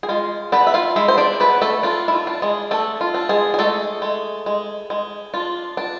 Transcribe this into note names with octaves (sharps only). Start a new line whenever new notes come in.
G#4
G#3 F4
B3 D4 B4
E5
F4 F5
G#3 E4 E5
C5
D4 D5
B3 D4 B4
A3 A4
D4 F4
E4
F4
D4
G#3 G#4
A3 D4 A4
F4
D4
G#3 G#4
G#4
G#3 A3 A4
G#3
G#3
G#3
D4 F4
D4